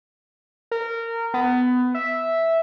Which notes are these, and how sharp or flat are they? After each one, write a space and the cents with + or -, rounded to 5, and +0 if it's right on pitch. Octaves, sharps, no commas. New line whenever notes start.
A#4 -20
B3 +20
E5 -5